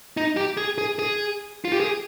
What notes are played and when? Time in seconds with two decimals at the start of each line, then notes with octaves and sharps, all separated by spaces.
0.17 D#4
0.37 G4
0.57 G#4
0.78 G#4
0.99 G#4
1.65 F4
1.72 G4
1.80 G#4